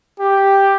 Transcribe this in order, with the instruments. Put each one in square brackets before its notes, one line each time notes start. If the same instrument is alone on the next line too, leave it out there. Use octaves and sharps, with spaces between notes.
[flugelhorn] G4